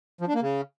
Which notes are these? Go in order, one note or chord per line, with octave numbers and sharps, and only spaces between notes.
F3
D4
A#3
C#3